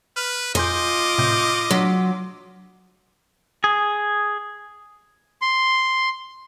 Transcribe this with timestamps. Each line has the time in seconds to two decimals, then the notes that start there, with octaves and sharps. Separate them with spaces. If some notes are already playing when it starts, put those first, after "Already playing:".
0.16 B4 F6
0.55 F2 F4 D#5 G#5 C6 D6 G6
1.18 A2 C3 G6
1.71 F#3 D4 C6 B6
3.64 G#4
5.42 C6